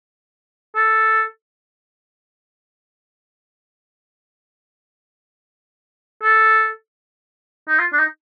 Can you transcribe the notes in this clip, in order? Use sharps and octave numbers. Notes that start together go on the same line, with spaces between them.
A4
A4
D#4
F4
D4
D#4